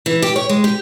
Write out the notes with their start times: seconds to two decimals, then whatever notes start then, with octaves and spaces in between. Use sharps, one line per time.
0.06 E3
0.22 G4
0.36 C#5
0.49 G#3
0.64 G4